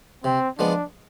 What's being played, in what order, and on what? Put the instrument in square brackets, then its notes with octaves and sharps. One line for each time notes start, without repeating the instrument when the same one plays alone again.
[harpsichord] C3 [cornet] C4
[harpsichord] F3 G#3 B3 [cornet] D4